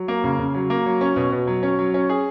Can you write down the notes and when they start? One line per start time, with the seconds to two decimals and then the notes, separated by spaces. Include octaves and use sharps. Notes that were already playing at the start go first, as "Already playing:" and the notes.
Already playing: F#3
0.08 A#3
0.24 C#3
0.39 C#3
0.54 F#3
0.70 A#3
0.86 F#3
1.01 C#4
1.16 B2
1.32 B2
1.47 F#3
1.63 C#4
1.79 F#3
1.94 C#4
2.09 G#4